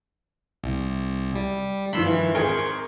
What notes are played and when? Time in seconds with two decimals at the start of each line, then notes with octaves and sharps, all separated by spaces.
0.64 C2
1.35 G3
1.93 G2 D#3 F3 B5 C6 E6
2.06 E3
2.35 G#1 G#4 A#4 C6 C#6